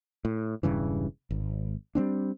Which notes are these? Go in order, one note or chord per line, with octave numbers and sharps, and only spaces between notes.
A2
E1 G2 C#3 E3
G#1
G3 G#3 C4 D4